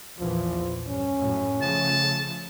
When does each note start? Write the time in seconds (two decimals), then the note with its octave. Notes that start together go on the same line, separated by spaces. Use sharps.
0.19 A#1 E2 E3 F3
0.88 G2 C#4
1.19 F#2 A2
1.62 C#3 F3 A3 A5